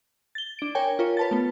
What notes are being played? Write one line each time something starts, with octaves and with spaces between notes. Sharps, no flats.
A6 G7
D4 D7
A#4 C#5 G5 G#5
F4 A#4 C#5
B4 A5 A6
A3 B3